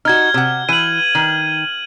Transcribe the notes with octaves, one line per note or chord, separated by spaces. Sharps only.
D#4 F#4 F6 G#6
C3 F#5
E3 D#7 F#7
D#3